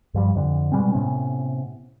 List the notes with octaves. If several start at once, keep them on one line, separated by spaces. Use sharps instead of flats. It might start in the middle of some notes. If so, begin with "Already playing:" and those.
G2 F3 G3
F2 D3
B2 G3 G#3 C4
A2 C3 B3 C#4